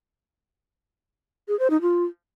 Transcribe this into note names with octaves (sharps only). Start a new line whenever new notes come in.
G#4
C5
D#4
F4